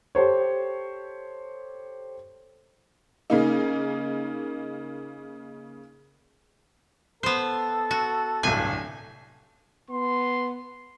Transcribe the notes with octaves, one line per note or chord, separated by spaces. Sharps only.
G4 A4 C5 C#5
C#3 A#3 D#4
B3 A4 C5
F#4
D1 G1 C2 G#5
B3 C6